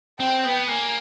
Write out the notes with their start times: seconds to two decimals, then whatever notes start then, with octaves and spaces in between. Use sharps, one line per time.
0.20 C4 G5
0.45 B3
0.69 A#3 G#5